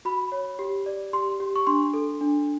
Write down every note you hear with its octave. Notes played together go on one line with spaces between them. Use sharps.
F#4 B5
C#5
G4
D5
G4 C6
G4
C#6
D4 C6
A4
D4